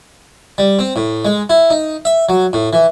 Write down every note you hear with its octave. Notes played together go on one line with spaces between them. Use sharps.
G3
C4
A2
G#3
E4
D#4
E5
F#3
A2
E3